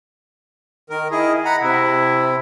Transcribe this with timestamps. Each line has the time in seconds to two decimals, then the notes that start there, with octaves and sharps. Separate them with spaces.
0.90 D#3 A#4
1.11 E4 G#4 D#5
1.45 F#5 A#5 B5
1.61 C3 E4